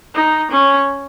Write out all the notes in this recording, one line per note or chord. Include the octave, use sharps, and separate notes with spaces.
D#4
C#4